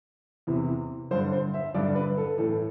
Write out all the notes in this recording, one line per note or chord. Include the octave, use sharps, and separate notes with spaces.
E2 C3 E3
G2 D3 C5
C5
E5
G2 D3 D5
B4
A4
A2 E3 A4